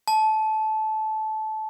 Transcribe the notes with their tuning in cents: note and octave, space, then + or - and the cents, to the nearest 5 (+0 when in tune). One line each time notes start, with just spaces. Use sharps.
A5 -20